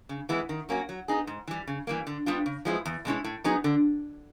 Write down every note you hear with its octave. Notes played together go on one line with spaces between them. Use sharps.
C#3
E3 G#3 B3 E4
D#3
F#3 A#3 C#4 F#4
F#3
B3 D#4 G#4
G#2
E3 G3
C#3
E3 G3 A#3
D3
G3 B3 D4 F4
C#3
F3 G#3 B3 E4
E2
B2 G#3 C#4 E4
A2
F#3 B3 D#4 G#4
D3